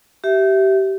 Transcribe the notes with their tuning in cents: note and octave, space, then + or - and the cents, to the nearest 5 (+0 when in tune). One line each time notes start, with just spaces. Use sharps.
G4 -25 E5 +0